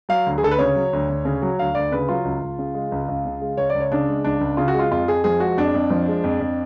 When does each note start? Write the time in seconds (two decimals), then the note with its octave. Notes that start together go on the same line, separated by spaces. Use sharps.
0.09 F#3 F5
0.26 D2
0.38 G#4
0.43 D2 A4
0.51 B4
0.58 C#3 C#5
0.75 F#3
0.93 D2
1.09 D2
1.25 C#3
1.42 F#3
1.59 D2 F5
1.75 D2 D5
1.92 C#3 B4
2.09 F#3 F4
2.25 C#2
2.41 C#2
2.59 C#3
2.74 G#3
2.92 C#2
3.08 C#2
3.25 C#3
3.41 G#3
3.57 C#2 C#5
3.70 C#2 D5
3.80 C#5
3.92 C#3 D4
4.09 G#3
4.24 C#2 D4
4.41 C#2
4.57 C#3 F4
4.68 F#4
4.74 G#3 F4
4.91 F2 F4
5.08 F2 G#4
5.24 F3 G#4
5.40 G#3 F#4
5.57 F2 D4
5.74 F2
5.90 F3
6.08 G#3
6.24 F2
6.40 F2